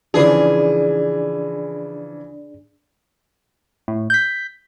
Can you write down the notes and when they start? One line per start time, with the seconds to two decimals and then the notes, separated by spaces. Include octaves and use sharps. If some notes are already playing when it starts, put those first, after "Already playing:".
0.14 C#3 E3 F3 D4 G#4 D5
3.88 A2
4.10 G6 B6